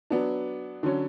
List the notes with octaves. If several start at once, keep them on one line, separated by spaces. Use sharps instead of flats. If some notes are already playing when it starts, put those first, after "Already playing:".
F#3 B3 D4
D3 F#3 C#4